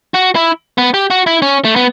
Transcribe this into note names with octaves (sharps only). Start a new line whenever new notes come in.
F#4
E4
B3
G4
F#4
E4
C#4
A3
B3